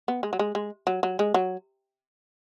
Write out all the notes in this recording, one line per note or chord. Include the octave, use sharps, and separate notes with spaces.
B3
G#3
F#3
G#3
G#3
F#3
F#3
G#3
F#3